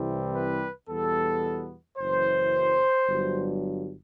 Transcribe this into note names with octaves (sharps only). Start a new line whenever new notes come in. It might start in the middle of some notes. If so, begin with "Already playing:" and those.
Already playing: C2 C3 E3 G3 C4
B4
E2 B2 G3 B3 A4
F#1 F#2 E3 C5
G1 G2 F#3